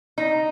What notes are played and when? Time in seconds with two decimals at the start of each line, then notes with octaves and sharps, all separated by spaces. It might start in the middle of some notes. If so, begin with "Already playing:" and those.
0.18 D#4